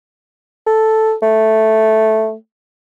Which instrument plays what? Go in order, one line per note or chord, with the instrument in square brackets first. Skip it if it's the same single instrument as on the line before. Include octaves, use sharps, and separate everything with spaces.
[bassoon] A4
A3